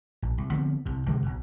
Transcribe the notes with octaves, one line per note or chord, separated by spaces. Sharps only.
A#1
C2
D3 F3 B3 C4
C2 C3
B2 D3 F3 G#3
B1 B2